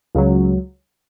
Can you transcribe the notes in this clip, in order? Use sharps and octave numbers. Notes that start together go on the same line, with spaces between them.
C#2 C#3 F#3